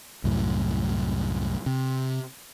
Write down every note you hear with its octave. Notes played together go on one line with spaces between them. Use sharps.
C2 F#2 A2
C3